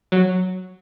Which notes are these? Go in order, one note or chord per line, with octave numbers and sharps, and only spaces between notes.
F#3